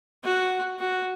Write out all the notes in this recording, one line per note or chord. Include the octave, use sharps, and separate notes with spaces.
F#4
F#4